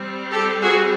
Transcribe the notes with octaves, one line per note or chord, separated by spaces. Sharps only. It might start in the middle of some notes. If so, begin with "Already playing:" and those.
Already playing: G3 C4
G4 A4
F#4 G#4